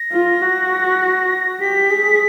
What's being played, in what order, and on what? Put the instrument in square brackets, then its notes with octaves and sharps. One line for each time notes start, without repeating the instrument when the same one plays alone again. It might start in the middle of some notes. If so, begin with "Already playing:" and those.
Already playing: [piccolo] A#6
[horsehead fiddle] F4
F#4
[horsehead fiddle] G4 [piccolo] B6
[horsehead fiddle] G#4